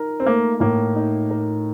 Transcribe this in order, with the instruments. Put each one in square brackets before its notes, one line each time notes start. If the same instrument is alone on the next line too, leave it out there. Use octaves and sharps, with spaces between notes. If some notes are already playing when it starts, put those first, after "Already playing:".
Already playing: [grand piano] D#4 A#4
[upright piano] C4
[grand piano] A3 [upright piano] A#3
[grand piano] A2 [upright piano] A#3
[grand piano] D#4
A#4